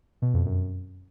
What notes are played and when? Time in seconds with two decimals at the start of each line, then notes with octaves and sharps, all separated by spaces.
0.22 B2
0.34 F2
0.46 F#2